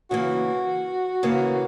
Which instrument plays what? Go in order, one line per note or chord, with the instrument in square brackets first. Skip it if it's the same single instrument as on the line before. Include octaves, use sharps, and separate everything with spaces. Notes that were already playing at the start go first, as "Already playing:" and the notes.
[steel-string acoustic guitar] C#3 E3 A#3 [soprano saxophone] F#4
[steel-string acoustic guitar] C#3 E3 A#3